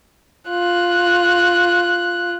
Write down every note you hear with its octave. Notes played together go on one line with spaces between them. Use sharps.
F4 F#6